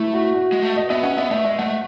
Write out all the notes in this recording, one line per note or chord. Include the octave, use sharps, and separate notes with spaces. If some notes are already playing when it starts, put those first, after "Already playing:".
Already playing: A3 E4
F#4
F#4
G#3
A3
D#5
B3 E5
C#4 F#5
B3 E5
A3 E5
G#3 E5
A3 F#5